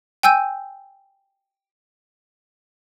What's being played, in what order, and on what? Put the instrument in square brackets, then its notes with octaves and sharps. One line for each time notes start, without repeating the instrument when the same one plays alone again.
[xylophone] G5 G#5 E6 G6 D#7